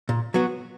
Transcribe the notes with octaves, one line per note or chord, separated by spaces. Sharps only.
A#2
F#3 B3 F#4